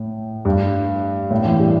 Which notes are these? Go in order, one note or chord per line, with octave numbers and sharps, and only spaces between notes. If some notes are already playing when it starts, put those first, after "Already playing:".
Already playing: A2
G2
A2
E3
G3